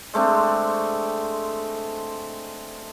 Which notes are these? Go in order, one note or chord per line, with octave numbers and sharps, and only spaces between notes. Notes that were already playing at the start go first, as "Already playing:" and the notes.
G#3 A3 C4 D4